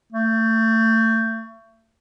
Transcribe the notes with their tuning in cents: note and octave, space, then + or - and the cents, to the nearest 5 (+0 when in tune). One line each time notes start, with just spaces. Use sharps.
A3 +30